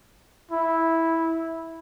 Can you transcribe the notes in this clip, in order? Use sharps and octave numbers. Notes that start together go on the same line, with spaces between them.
E4